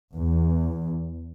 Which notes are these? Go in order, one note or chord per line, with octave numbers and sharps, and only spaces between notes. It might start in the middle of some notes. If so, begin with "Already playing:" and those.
E2